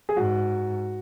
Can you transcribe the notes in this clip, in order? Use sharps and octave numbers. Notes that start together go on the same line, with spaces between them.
G#4
G#2 F#4